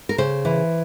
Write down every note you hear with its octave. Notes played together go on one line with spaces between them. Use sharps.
A#4
C#3 C5
E3